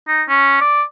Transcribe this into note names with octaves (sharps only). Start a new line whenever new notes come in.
D#4
C#4
D5